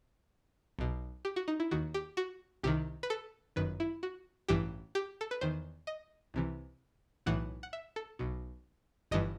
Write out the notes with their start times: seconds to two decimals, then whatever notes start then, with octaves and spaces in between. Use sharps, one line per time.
0.79 B1 B2
1.25 G4
1.36 F#4
1.48 D#4
1.60 E4
1.71 D#2 D#3 F#4
1.94 G4
2.17 F#4
2.63 C2 C3 D#3 G4
3.03 B4
3.10 A4
3.56 G1 F#2 D#3 B4
3.80 E4
4.03 F#4
4.48 A1 G2 E3 G4
4.95 G4
5.21 A4
5.31 B4
5.41 E2 D#3 C5
5.87 D#5
6.34 C2 C3 E3
7.26 B1 A2 E3 F#5
7.63 F#5
7.73 E5
7.96 A4
8.19 B1 B2
9.11 G1 G2 E3 D#5